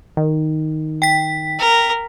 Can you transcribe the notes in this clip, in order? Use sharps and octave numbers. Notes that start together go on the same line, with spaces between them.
D#3
G5 B6
A#4